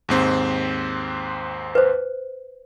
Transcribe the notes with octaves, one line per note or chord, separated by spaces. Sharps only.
D#2 G#2 C4
B4 C5